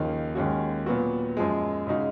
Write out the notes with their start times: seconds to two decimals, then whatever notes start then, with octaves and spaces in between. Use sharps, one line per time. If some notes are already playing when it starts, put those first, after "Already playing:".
Already playing: D#2 C#3 F3 A#3 D#4
0.35 D#2 D#3 G#3 C#4 F#4
0.86 A#2 F#3 B3 F#4
1.37 F#2 F3 G#3
1.87 C#3 G#3 D#4 F#4